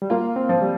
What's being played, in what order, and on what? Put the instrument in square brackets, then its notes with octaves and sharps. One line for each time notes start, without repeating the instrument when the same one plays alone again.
[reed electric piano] G3
[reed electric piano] A#3 [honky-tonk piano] F4
[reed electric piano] C4
[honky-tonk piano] F3
[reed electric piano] G3